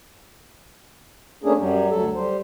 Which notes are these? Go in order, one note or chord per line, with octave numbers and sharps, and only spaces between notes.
A3 A#3 C#4 D4 G#4
F#2 F#3 G3
D2 F#3 A4
G3 C5